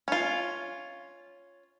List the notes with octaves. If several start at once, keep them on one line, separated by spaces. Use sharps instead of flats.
C#4 F4